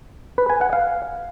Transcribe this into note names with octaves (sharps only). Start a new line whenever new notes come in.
B4
G#5
F#5
F5